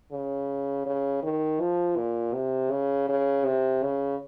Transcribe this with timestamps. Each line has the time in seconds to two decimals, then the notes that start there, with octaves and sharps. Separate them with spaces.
0.12 C#3
0.86 C#3
1.23 D#3
1.60 F3
1.97 A#2
2.34 C3
2.71 C#3
3.09 C#3
3.45 C3
3.82 C#3